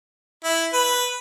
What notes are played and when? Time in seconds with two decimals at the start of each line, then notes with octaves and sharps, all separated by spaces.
0.45 E4
0.73 B4